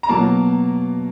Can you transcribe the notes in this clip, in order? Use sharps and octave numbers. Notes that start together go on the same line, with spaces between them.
A#5
B2 F#3 A#3 A5